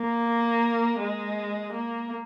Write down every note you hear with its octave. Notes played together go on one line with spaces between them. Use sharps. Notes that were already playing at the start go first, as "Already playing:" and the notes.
Already playing: A#3
G#3
A#3